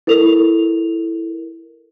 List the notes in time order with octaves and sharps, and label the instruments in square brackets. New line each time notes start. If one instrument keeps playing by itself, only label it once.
[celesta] E4 A4 A#4 F7